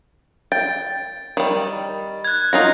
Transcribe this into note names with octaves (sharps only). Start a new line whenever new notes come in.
G5 A6
D#3 G3
F#6 G#6
D#4 F4 F#4 A#6